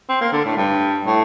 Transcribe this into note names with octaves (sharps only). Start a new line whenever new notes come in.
C4
A#3
D3
A2
G2
A2